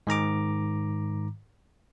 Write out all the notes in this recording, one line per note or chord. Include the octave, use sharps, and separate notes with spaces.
G#2 D#3 A#5 D6